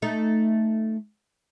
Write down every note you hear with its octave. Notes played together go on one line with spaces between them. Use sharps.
A3 D#4